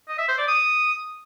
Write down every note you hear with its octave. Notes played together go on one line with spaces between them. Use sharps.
D#5
E5
C5
D5
D#6